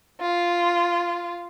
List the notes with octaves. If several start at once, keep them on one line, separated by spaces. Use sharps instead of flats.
F4